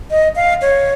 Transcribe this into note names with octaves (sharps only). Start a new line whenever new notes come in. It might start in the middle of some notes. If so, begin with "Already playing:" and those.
D#5
F5
C#5